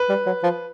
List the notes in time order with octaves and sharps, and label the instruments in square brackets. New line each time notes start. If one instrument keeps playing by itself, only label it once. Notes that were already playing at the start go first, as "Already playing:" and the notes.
Already playing: [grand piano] B4
[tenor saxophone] G3
F#3
F3